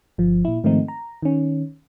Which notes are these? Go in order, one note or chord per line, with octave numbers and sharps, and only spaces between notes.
G1 F3
A#2 E4
G#2 D#3 F3 A3 C4 D#4
A#5
D#3 C#4